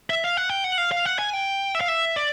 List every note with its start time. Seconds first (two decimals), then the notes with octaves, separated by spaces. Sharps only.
0.10 E5
0.24 F5
0.37 F#5
0.50 G5
0.64 F#5
0.78 F5
0.92 F5
1.05 F#5
1.19 G#5
1.33 G5
1.75 E5
1.81 F5
1.88 E5
2.16 D5